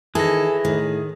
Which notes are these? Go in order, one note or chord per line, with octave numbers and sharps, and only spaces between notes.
D#3 E3 G#4 A4 A#6
A2 D#3